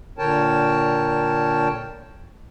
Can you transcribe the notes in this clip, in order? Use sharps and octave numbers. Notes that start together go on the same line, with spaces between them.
A#2 D3 A#4 C#5 G5 A5